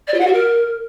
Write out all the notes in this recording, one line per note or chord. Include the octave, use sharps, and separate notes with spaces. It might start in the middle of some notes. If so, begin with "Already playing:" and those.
D5
F4
F#5
F#4
A#4